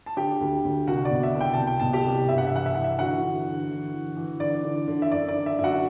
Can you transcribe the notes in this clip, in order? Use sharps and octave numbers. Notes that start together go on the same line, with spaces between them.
A5
D3 G4 G5
D2
D2
C2 F#4 F#5
D5
B2
E5
C2
G5
C2 A5
G5
B2 A5
G4 G5
C2
G2 E5
F#5
E5
E3 F#5
E5
E3 F#5
E5
D3 F#4 F#5
D3
D3
E3
E3
E3
D3 D5
D3
D3
E5
F#2 D5
D5
D3
E5
F#2 E5
F#4 F#5